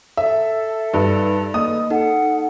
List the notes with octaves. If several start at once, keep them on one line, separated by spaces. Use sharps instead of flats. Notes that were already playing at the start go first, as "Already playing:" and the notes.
A4 E5
G2 D#4 B4
A#3 D#5 D#6
D#4 A4 F#5 A5